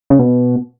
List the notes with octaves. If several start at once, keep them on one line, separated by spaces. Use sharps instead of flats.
C#3
B2